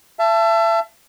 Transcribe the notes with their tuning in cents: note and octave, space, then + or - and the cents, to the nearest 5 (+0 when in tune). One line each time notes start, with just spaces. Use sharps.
E5 +35 A5 +0